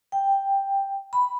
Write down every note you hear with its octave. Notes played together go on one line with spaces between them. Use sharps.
G5
B5